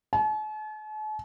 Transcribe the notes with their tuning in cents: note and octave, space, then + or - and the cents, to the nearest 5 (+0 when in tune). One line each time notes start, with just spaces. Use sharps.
A5 -45